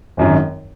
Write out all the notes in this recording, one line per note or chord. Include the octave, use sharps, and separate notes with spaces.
G#1 F#2 D#3